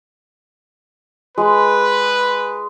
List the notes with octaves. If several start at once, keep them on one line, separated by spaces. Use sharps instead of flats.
G#3 B4